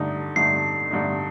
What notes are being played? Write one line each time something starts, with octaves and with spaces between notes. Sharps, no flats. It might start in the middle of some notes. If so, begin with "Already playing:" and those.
Already playing: G2 D3 A3 D#4
G2 D3 A3 D#4 C7
G2 D3 A3 D#4